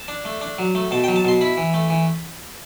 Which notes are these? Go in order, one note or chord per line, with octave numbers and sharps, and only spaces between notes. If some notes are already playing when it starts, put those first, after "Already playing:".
Already playing: A5
D4
A3
D4
F#3
A3
B2 A5
F#3 G5
A5
B2 C6
E4 B5
E3
A3
E3